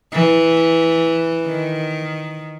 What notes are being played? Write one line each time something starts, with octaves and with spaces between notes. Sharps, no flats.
E3
D#3